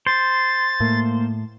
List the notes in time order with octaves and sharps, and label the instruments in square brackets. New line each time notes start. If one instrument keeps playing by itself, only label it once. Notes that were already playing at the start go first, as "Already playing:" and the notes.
[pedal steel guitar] C5 [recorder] A6
[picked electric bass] A2 [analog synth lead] A#3